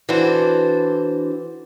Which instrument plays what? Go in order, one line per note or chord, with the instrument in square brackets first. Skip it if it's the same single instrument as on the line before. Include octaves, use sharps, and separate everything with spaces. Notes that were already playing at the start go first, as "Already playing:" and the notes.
[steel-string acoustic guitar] E3 D4 F#4 A4 C5